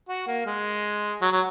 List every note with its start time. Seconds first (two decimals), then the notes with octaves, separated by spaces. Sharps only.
0.09 F#4
0.27 A#3
0.46 G#3
1.21 F#3
1.32 F#3